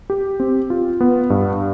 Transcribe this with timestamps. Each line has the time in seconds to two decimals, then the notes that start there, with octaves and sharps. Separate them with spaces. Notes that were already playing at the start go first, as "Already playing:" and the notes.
0.10 G4
0.40 C4
0.70 F4
1.01 B3
1.30 G2